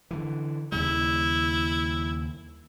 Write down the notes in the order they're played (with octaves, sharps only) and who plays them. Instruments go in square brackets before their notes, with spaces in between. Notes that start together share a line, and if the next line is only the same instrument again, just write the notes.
[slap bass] D3 E3
[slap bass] D#2 C#3 G3 [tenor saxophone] E4